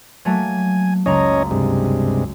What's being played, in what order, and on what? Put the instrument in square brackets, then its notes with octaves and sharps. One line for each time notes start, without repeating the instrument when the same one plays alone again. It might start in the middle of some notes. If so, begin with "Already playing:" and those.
[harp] F#3 A3 A#3 [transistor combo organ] G#5
[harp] F#1 C#2 A#5 [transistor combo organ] C#4 C#5 D#5
[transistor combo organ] G2 C3 G#3